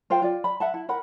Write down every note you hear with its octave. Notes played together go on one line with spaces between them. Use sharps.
F4 C5 F5 G5
F4 D5
B5
E5 F#5 A5
E4
A#4 F#5 B5